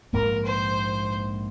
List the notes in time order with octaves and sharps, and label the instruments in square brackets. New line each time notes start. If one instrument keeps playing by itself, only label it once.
[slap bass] A#1 G#2 F3 A#3 [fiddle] A#4
[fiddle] C5